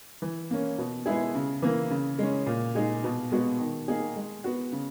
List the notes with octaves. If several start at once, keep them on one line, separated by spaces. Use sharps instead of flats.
E3
A#3 C#4
B2
G#3 B3 E4 G#4
C#3
E3 A#3
C#3
G#3 C#4
A#2
G#3 D#4 G#4
B2
G#3 B3 F#4
D#3
A#3 D#4 G#4
G#3
B3 F#4
C#3